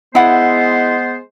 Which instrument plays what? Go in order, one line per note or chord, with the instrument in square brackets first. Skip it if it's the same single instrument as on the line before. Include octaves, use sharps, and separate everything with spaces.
[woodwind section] G#3 B3 C5 [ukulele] E4 F#5